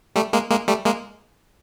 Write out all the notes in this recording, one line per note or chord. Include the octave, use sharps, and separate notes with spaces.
G3 A3
G#3 A#3
G#3 A#3
G3 A3
G#3 A#3